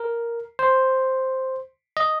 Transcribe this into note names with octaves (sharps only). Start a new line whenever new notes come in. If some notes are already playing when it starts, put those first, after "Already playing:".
Already playing: A#4
C5
D#5